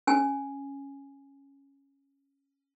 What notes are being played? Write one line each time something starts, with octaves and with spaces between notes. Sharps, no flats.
C#4 G#5